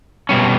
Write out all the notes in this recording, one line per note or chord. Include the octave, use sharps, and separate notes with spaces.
B2 G3 C#4